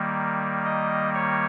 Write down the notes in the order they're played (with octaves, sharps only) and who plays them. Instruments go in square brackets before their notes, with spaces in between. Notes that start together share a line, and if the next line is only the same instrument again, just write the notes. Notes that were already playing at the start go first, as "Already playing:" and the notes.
Already playing: [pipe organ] D#3 G3 A#3
D#5
C#5